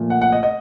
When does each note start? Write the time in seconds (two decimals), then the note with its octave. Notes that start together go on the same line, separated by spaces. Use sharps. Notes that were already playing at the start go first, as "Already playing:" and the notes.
Already playing: A#2 F3 A3
0.10 F#5
0.21 F#5
0.32 D#5
0.43 D#5